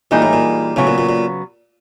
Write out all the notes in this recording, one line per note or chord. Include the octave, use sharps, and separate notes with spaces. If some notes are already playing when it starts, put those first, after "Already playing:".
A#2 E3 G3 A#3 D#4 G#4
A2
A#2
A2 C#3 F#3 B3
A#2
A#2
A#2